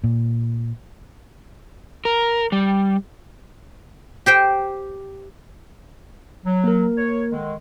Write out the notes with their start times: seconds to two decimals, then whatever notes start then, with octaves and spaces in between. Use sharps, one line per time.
0.04 A#2
2.05 A#4
2.52 G3
4.26 G4 C5 G5
6.45 F#3
6.64 A#3 A#4
6.98 C#5
7.31 D3 D#3 G#3